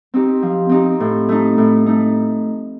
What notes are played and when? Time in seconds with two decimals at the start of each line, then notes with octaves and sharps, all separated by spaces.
0.14 C4 D#4 G4
0.42 F3
0.69 C4 D#4 G4
1.00 A2
1.29 A3 D#4
1.58 A2
1.86 A3 D#4